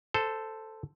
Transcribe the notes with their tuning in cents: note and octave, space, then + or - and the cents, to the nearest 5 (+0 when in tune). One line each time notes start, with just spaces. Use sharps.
A4 +0 C5 -10